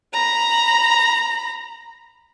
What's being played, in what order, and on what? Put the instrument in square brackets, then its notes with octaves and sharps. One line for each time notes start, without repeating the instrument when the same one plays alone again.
[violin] A#5 B5